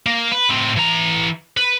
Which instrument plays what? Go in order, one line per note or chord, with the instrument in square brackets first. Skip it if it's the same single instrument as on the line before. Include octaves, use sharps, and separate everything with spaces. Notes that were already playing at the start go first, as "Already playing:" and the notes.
[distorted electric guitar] A#3
B4
A2 C4
E3 A#5
B4